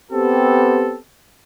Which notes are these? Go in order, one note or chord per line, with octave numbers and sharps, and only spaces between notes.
B3 C4 G4 A4